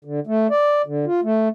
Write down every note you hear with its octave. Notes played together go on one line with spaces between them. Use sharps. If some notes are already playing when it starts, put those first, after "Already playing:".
D3
A3
D5
D3
F4
A3